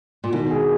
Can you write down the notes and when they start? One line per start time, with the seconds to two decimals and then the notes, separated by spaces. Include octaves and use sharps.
0.24 A#2
0.32 B2 D#3
0.51 G#4